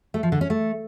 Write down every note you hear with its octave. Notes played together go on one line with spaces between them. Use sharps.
A3
F3
D3
C#4
A3